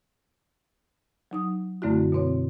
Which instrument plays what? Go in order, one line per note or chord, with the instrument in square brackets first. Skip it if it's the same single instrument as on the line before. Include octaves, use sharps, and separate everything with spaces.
[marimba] F#3 D#4 D#6
F#2 D3 A3 C4 E4 F#4
B2 C4 C#5